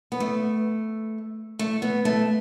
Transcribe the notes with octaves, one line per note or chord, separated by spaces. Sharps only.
B3
A3
A3
B3
A3